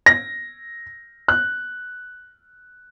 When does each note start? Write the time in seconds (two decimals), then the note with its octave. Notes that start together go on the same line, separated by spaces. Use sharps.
0.06 A#6
1.28 F#6